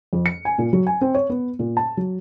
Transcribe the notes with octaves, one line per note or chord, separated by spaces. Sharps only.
F2
C#7
G#5
A#2
F#3
G#5
C4
C#5
B3
A#2
A5
F#3